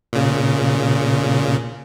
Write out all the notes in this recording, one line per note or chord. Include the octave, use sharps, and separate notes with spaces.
A#2 C#3